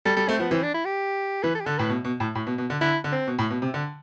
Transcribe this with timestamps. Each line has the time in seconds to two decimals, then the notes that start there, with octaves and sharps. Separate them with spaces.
0.05 G3 A4
0.16 G3 A4
0.28 A3 C4
0.39 F3 B3
0.51 E3 C4
0.63 D4
0.74 E4
0.85 G4
1.43 E3 B4
1.55 A4
1.60 G4
1.66 D3 A4
1.78 A2 B4
1.89 B2
2.05 B2
2.20 A2
2.35 A2
2.47 B2
2.58 B2
2.70 D3
2.81 D3 E4
3.04 D3
3.12 C4
3.27 B2
3.39 A2
3.50 B2
3.62 C3
3.74 D3